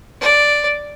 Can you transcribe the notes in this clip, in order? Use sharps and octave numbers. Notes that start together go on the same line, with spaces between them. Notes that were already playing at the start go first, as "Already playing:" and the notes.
D5